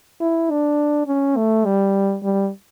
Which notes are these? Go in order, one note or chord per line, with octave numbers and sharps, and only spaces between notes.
E4
D4
C#4
A3
G3
G3